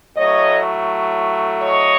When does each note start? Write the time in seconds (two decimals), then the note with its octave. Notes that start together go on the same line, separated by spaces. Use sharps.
0.16 A2 F#3 A3 C#5 D#5
1.62 C#5 D#5